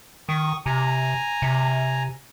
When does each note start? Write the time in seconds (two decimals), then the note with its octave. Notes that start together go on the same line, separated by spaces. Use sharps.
0.29 D#3 C#6 D#6
0.66 C3 G#5 A#5
1.42 C3